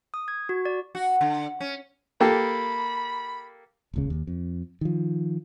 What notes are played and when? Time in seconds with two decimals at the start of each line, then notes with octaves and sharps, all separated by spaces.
0.14 D#6
0.28 G#6
0.49 F#4
0.65 D5
0.95 F#4
1.21 D3
1.60 C#4
2.21 A#3 G4 A4 B5
3.94 D#1 C#2 C#3
4.10 D#2
4.27 F2
4.81 D#3 F3